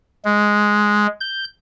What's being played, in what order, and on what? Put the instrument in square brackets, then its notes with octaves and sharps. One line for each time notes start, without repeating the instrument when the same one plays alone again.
[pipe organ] G#3
G6